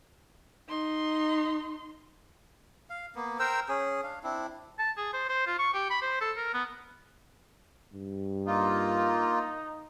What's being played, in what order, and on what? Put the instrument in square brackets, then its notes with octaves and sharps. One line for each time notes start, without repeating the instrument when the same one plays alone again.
[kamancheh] D#4 C6
[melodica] F5
A#3 B3
A#4 C5 G5 E6
C#4 G#4
D4 F5
C4 D4 E4
[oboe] A5
G#4
C5
C5
F4
C#6
G4
B5
C5
A4
A#4
B3
[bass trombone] G2
[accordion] A#3 F4 [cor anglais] D#4